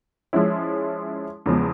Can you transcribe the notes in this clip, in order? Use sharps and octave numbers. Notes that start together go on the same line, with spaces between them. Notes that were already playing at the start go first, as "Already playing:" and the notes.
F3 G#3 C#4 E4
E2 C#3 F3 G#3